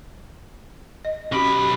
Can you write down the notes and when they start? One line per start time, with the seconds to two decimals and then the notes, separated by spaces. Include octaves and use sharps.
1.05 D#5
1.32 B1 C#4 F#4 G4 B5